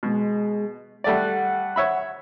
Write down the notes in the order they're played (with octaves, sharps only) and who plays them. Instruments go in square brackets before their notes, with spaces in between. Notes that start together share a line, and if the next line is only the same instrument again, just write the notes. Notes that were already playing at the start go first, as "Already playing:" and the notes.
[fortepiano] B2 [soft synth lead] G#3
[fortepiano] G3 A3 D5 [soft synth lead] F#5
[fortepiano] C#5 E5 B5